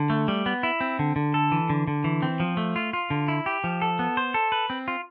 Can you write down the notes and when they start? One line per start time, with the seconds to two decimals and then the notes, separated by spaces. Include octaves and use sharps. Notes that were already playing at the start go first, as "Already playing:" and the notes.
Already playing: D3
0.10 A3
0.28 G3
0.46 B3
0.63 E4
0.81 C4
0.99 D3
1.16 D3
1.34 A4
1.52 E3
1.70 D3
1.88 D3
2.04 E3
2.22 C4
2.40 F3
2.57 A3
2.76 F4
2.93 F4
3.10 D3
3.28 E4
3.46 G4
3.64 F3
3.82 A4
3.99 B3
4.17 C5
4.34 A4
4.52 B4
4.70 C4
4.88 F4